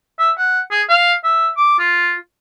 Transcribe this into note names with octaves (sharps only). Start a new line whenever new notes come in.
E5
F#5
G#4
F5
E5
D6
F4